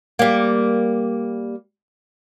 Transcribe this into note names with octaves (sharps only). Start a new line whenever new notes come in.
G3 A#3